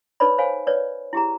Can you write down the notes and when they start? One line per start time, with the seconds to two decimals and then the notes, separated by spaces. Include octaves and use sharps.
0.20 D#4 A4 B4 C#5 D5 B5
0.38 C5 C#5 F5 G#5
0.67 B4 C#5 D5
1.13 E4 G4 G#4 A#5